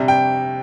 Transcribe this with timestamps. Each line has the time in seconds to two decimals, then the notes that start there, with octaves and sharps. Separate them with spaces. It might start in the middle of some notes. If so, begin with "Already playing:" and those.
Already playing: C3 G3 D4
0.08 G5